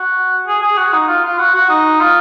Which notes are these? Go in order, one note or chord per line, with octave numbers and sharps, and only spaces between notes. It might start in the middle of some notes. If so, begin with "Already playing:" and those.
Already playing: F#4
G#4
G#4
F#4
D#4
F4
F4
F#4
F#4
D#4
F4